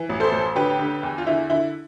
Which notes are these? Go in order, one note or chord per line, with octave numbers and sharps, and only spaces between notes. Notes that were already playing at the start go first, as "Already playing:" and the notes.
Already playing: E3
A1
A4 C5
A1
D3 G4 B4
D3
E2
F4
D3 E4
D3 E4